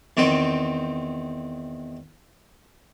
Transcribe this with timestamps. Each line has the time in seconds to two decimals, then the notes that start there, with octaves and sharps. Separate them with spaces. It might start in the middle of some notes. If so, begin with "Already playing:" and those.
0.17 E2 D#3 C4 G5